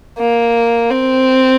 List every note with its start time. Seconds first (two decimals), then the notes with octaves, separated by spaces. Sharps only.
0.19 A#3
0.91 C4